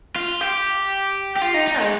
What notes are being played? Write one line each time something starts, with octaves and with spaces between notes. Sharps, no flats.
F4
G4
G4
F4
D#4
D#4
G#3